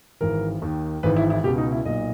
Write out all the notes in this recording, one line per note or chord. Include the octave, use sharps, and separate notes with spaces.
G#1 G#2 E3 A#4
D#2 D#3
G#1 G#2 E3 B4
E4
E4
C#2 B2 G4
D#4
E4
B1 A#2 D#5